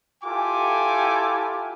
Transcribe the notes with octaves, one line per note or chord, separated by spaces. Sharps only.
E4 F4 G4 A4 G#5 D6